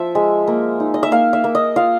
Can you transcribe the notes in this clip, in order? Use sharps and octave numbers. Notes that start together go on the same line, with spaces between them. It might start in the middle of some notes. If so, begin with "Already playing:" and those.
Already playing: F3 E5
G#3
A#3
D#4
D#5
E5
A#3 F5
E5
A#3
D#5
F4 F5